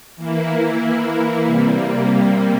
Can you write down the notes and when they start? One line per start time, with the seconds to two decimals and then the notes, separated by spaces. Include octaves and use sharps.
0.16 E3 A#3 E4
1.45 C3 G3 A#3